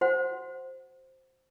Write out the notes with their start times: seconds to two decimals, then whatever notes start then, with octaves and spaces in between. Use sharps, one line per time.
0.01 F#4 C5 F#5